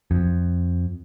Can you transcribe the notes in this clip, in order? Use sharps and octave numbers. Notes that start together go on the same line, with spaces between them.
F2